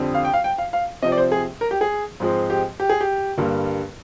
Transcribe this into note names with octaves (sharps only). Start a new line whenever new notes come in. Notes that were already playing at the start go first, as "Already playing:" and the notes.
Already playing: F2 D3 G3 C4
F5
G5
F5
G5
F5
F5
C3 F3 C4 D#5
D5
C5
G#4
A#4
G4
G#4
G#2 F3 G#3 C4
G4
G4
G#4
G4
G2 D3 G3 A#3